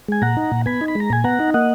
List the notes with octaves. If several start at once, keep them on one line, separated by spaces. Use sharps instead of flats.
G#3 G#5
A#2 F#5 A#5
D#4
A#2
B3 G#5 B5
D#4
B5
G#3
A#5
A#2 G#5
B3 F#5 A#5
D#4
A#3 D#5 F#5